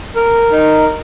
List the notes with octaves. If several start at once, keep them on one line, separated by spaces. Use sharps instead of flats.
A#4
D#4